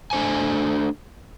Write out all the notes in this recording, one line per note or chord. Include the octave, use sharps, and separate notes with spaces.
A3 D4 C5 G#5